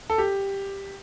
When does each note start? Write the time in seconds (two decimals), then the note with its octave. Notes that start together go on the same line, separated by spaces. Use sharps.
0.10 A4
0.18 G4